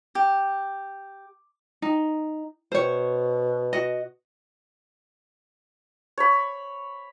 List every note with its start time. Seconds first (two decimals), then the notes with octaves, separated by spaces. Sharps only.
0.15 G4
1.82 D#4
2.72 B2 C5 C#5
3.73 F#4 D#5
6.18 C#5 B5